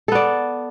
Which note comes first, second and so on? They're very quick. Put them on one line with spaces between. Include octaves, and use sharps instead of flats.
A4 B3 D5